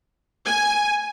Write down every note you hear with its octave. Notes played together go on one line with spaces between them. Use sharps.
G#5